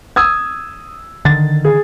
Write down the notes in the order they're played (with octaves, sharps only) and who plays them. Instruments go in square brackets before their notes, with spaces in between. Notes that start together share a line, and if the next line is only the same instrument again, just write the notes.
[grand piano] D#6 E6 G#6
[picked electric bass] D3 D#3 [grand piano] A6
[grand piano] G#4